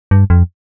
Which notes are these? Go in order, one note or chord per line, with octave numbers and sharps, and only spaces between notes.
G2
F2